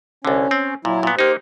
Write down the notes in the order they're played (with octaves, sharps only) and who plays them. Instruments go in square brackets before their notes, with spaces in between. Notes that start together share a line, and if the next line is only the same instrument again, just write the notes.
[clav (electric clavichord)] C2 D3 [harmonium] C#4
[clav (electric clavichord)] C4
[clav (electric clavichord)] A#2 [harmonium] F#3 E4
[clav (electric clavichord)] A#2 B3
[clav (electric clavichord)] A#3 D#4 [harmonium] G4 C5